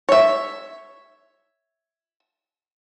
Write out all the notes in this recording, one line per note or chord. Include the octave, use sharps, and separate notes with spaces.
C#5 E5